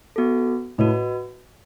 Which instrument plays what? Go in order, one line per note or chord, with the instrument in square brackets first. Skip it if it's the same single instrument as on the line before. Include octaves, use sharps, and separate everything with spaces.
[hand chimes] B3 F#4 A4
[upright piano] A2 [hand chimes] F#4 B4 D#5